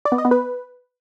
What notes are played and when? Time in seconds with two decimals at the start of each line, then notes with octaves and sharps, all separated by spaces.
0.05 D5
0.12 B3
0.18 D#5
0.25 B3
0.31 B4